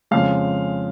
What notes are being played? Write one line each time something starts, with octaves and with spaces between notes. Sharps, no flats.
F2 C#3 G#3 F5